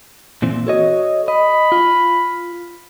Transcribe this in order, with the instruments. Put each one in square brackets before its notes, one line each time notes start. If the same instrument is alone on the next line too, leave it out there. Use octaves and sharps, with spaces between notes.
[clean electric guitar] A#2 E3 C4
[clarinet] F#4 [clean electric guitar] A4 C#5 D#5
[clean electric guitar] D#5 [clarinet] B5
[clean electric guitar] F4